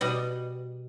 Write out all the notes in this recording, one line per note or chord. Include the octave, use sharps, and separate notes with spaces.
B2 G3 D#5